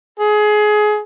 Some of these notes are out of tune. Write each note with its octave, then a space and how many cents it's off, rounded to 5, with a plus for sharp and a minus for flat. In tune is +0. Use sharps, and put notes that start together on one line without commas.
G#4 +25